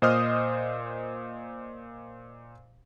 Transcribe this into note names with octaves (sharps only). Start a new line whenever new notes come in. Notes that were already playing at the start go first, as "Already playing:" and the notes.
A#2 C5 D#5 D#6 F6